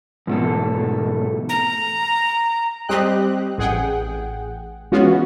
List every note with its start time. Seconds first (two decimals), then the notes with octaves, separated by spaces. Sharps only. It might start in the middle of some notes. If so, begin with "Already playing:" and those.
0.27 E2 G#2 B2 A3 A4
1.49 A#5
2.89 G3 C4 G4 D#5 G5 F#6
3.58 A1 G#4 F#5 G5
4.92 E3 G#3 B3 C#4 F4 F#4